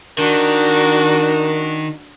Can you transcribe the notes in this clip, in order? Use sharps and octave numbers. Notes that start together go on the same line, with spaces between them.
D#3 D4 F#4 A#4